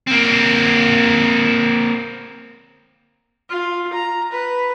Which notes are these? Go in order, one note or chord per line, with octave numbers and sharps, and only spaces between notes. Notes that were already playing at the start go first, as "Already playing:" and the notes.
A#3 C4
F4
A#5
B4